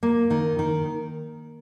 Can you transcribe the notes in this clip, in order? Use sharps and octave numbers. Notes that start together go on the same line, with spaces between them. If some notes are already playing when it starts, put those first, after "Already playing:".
A#3
D#3
D#3